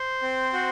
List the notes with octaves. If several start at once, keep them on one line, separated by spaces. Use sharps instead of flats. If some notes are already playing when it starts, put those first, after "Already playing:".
Already playing: C5
C4
F#4